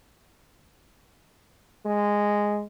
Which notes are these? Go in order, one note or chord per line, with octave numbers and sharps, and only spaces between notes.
G#3